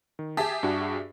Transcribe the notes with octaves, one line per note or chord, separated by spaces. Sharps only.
D#3
G4 G#4 E5 G#5 A5
G2 D4 F#4